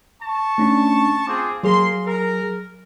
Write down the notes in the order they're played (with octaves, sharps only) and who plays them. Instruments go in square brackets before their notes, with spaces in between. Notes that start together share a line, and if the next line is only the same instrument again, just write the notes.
[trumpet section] A5 C#6
[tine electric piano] A3 C#4 D4
[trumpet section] C4 F4 G#4 [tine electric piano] D6
[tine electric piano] F#3 G#4 [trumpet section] A#3 C6
[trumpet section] A#4